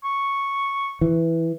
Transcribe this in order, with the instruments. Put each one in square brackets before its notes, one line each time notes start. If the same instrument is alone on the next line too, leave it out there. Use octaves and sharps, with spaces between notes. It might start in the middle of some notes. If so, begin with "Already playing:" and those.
[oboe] C#6
[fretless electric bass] E3